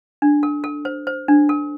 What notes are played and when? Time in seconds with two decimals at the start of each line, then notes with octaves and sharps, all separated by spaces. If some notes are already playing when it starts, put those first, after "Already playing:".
0.22 D4
0.43 A4
0.64 A4
0.85 C5
1.07 C5
1.28 D4
1.49 A4